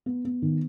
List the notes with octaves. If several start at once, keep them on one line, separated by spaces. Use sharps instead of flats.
B3
B3
D#3